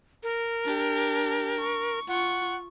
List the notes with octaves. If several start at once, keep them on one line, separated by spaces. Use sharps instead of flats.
A#4
D4 G4
C#6
F4 F#5 C#6